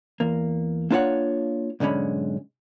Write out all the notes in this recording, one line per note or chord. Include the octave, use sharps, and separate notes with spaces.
E2 A#3
A#3 D4 F4 G#4 C#5 F#5
B1 G#2 D3 G#3 C#4 B5